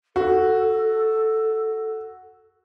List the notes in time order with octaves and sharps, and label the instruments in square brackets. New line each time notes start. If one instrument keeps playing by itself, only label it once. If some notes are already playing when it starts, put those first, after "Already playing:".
[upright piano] F#4 [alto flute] A4